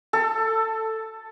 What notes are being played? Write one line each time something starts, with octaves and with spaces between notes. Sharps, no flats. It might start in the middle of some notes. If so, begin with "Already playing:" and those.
A4